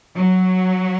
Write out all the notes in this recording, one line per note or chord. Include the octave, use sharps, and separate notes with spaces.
F#3